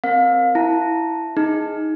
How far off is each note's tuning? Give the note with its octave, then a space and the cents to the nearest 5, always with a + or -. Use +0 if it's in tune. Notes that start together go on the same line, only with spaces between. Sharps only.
C4 +0 A#4 +0 F5 +30
E4 +0 A5 +0
D#4 +5 G#4 +0